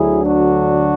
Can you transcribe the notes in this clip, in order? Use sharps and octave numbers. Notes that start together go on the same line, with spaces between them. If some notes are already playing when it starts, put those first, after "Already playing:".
Already playing: D2 D3 F#3 E4 G#4
D4 F#4